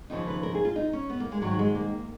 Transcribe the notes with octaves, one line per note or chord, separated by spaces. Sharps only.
D#2 C#3 F3 D#4
B4
A#4
G#4
F4
D#4
C#4
B3
A#3
G#3
G#2 D#3 F#3
G#3
A#3